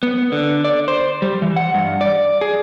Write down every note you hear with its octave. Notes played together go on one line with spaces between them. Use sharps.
B3
D3
D5
C5
G3
E3
F#5
G2
D5
G#4